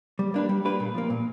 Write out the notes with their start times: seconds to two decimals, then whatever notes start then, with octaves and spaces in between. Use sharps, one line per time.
0.19 G3
0.34 A#3 D4 G4 B4
0.49 G3
0.65 A#3 D4 G4 B4
0.80 A#2
0.95 F3 A#3
1.10 A#2